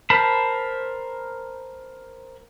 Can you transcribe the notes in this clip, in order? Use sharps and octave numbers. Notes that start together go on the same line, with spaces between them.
A#4 C5 A5 B5